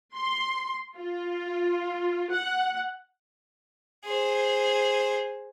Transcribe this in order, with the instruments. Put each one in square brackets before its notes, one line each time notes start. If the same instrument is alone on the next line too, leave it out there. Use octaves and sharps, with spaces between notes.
[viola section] C6
F4
F#5
[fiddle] G#4 C5